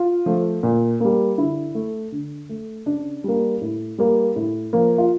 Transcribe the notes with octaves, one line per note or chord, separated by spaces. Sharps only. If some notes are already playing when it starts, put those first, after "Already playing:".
Already playing: F4
F3 A3
A#2
G3 A#3
D3 E4
A3
D3
A3
C#3 D4
G3 A#3
A2
G3 A#3
A2
F3 A#3
F4